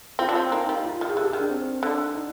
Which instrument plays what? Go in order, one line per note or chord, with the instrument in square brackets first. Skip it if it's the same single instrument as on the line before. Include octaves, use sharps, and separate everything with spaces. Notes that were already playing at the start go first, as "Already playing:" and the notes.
[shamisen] C4 [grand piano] F4
[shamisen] D4
C4
[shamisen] A#3 [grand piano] D#4
[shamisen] G3
[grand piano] F4
[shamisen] D#3
[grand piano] G#4
[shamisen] D3 [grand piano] G4
[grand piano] G#4
[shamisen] D#3
[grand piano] D4
C4
[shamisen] D3 [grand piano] D4
[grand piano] D#4